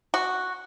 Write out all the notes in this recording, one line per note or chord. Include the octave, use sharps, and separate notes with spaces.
F#4